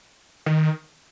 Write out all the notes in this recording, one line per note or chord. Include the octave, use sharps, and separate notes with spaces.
D#3